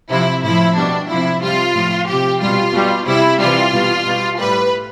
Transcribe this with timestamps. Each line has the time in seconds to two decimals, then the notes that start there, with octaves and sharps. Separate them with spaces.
0.10 C3 F3 E4
0.43 A2 F3 E4
0.77 B2 G3 D4
1.09 F3 E4
1.14 C3
1.42 C3 G3 F4
1.75 A2 F3
2.08 C3 F3 G4
2.42 B2 G3 F4
2.74 B2 G3
3.07 C3 G3 E4
3.40 C3 E3 G3 F4
3.73 B2 G3
4.07 B2 G3
4.39 A2 G3 B4